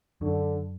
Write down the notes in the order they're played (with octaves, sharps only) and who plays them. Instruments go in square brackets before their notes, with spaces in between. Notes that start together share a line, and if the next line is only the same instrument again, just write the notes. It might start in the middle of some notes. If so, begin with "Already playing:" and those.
[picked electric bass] F#2 F#3 [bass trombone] D3